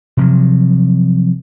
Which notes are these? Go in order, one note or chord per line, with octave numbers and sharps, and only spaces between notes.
C3 F3 F#3